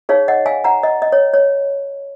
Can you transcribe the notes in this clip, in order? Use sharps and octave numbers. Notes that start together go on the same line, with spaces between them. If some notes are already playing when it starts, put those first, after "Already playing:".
D#4 G#4 C#5 F5
D#5 F#5
F5 G#5
F#5 A#5
D#5
D#5
C#5
C#5